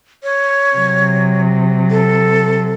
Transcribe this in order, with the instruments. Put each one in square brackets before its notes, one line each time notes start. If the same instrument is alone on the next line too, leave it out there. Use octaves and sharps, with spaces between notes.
[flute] C#5
[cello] C3 F#3
[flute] A4